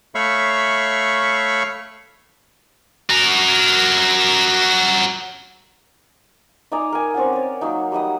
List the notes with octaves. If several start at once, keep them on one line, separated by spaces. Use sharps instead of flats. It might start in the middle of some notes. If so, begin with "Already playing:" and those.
A3 C#5 E5 F5 B5 C#6
F#4 A#4
D#4 D5 G#5 A#5
A#4 G#5
C4 C#4 D5 F#5
C#5 D5
F#3 A#3 D#4
G3 D#4 F#5 D#6